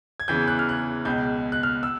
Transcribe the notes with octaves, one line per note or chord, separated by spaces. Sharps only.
G#6
E2 C#3 E3 G6
F#6
F6
F#6
C#2 B2 G6
F#6
F6
E6